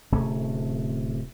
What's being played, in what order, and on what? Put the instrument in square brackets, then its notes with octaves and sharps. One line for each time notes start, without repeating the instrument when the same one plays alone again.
[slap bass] D1 C3 A3 C#4